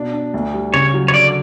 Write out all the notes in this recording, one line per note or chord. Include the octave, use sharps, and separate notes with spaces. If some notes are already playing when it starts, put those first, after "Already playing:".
Already playing: B2 D4
D4
D2
G3
C#3 C#5
F#3
C#5
D3 D5